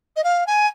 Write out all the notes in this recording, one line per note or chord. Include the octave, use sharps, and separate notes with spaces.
D#5
F5
G#5